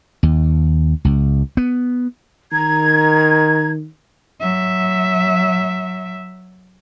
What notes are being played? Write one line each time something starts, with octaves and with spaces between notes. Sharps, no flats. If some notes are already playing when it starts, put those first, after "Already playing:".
D#2
C#2
B3
D#3 A#5 G#6
F#3 E5